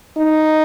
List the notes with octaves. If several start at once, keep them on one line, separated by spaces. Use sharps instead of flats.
D#4